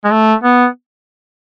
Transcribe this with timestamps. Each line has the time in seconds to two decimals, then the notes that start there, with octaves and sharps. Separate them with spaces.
0.05 G#3
0.11 A3
0.44 B3